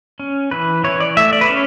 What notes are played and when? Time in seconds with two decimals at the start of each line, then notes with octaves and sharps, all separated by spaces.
0.20 C#4
0.51 E3 B4
0.84 E3 C#5
1.00 D5
1.17 A3 E5
1.33 D5
1.41 B4
1.48 C#4 C#5